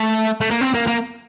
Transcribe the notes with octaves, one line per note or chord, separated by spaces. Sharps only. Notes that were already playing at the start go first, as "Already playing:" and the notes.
Already playing: A3
A3
A#3
C4
A#3
A#3